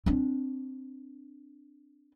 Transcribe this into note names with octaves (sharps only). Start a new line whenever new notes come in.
C4 D4